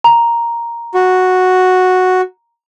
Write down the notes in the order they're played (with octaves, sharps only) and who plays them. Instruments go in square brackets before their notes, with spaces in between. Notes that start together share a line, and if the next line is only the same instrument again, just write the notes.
[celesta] A#5
[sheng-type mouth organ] F#4